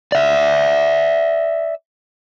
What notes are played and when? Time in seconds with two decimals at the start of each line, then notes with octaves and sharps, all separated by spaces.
0.12 D5 E5